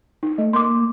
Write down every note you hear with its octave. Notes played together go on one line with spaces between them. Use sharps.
D#4
A3 D#5
A#3 C6 D6